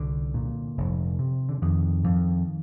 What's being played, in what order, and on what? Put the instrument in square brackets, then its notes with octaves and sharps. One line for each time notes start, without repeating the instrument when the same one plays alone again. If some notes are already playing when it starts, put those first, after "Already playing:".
Already playing: [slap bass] C2 D3
A#2
F1
C3
D3
F2 D#3
F2